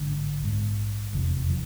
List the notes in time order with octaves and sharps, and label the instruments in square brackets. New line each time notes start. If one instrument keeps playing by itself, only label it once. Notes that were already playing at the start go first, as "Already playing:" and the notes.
Already playing: [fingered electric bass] A1 G#2 D3
A#1 G#2
F1 E2 C3 E3
F3